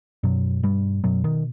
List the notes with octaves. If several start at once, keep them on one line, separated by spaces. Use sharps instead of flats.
F#2 B2 F#3
G2 G3
F#2 B2 F#3
D#3